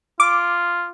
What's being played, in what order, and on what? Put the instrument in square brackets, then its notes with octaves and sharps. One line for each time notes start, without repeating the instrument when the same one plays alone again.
[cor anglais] F4 [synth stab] D6